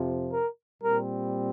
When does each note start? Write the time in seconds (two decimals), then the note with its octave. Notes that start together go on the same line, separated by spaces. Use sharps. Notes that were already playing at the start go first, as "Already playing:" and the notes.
Already playing: F2 C3 F3
0.33 A#4
0.82 A#2 G3 C4 A#4